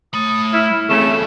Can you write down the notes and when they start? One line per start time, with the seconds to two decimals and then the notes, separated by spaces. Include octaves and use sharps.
0.13 A3 B5 D#6
0.53 E4 F6
0.89 E2 C#3 A3 C4 E7